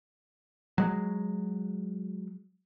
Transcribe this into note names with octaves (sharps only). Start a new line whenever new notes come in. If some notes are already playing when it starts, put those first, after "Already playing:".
F#3 G#3